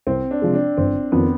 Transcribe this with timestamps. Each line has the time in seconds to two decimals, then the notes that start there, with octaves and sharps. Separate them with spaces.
0.06 C2 C4
0.31 D4
0.42 C3 F3 G#3
0.54 D4
0.77 G1 C4
1.12 F2 D#3 B3